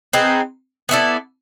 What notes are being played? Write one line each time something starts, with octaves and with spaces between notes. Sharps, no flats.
C4 D#4 G#4 B4
B3 E4 A4 D5